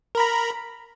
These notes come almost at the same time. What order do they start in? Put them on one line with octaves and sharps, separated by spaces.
A#4 B5 A#5